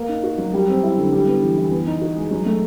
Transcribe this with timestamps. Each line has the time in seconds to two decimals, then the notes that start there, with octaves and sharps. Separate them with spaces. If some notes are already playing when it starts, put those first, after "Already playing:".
Already playing: A#3
0.09 D#4
0.23 F#4
0.38 F#3
0.53 G3
0.68 C4
0.83 E4
0.97 D3
1.12 G3
1.27 B3
1.42 E3
1.57 E3
1.71 B3
1.87 D#4
2.01 F#4
2.16 G#3
2.31 F#3
2.46 A3